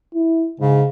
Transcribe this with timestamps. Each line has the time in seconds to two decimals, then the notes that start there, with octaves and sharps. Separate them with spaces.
0.15 E4
0.60 G#2 C#3